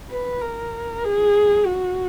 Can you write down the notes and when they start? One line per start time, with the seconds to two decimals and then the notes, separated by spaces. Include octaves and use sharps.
0.10 B4
0.41 A#4
1.04 G#4
1.66 F#4